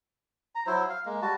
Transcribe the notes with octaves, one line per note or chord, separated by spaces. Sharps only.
A#5
F#3 E4 C5
F5
G#3 A#3
G3 F#4 A5